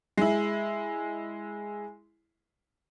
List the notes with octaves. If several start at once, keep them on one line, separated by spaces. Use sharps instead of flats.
G#3 E4